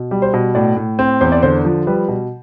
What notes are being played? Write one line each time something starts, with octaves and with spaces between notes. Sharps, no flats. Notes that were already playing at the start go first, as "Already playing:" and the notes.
Already playing: B2
G3
C5
B2
A2 D5
A2
C4
E2 C5
D5
D3 C5
F3
G3 B4
B2